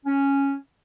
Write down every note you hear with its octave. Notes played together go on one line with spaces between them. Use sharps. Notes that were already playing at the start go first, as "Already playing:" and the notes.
C#4